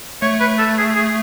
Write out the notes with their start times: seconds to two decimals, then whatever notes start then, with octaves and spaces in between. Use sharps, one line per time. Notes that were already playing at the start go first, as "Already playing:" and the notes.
0.22 A3 C#5
0.40 B4
0.58 A4
0.78 G#4
0.96 G#4